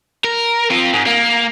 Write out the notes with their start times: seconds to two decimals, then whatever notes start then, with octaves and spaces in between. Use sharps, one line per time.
0.24 A#4
0.70 C4 F4
0.94 G#2
1.06 A#3